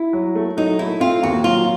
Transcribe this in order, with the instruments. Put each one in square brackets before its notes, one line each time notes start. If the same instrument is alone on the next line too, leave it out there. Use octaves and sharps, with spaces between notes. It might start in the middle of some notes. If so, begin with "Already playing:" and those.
Already playing: [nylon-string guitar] E4
[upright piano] F#3
A3
[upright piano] F#3 [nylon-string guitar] D#4
[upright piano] A3 [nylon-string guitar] E4
[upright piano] C4 [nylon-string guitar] F4
[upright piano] D#2 [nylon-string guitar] F#4
[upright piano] F#3 [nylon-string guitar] F4